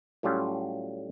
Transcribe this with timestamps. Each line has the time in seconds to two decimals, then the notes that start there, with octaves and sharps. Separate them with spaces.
0.23 A2 F#3 G3 C#4 F4